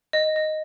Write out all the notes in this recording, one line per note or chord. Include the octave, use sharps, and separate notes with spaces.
D#5
D#5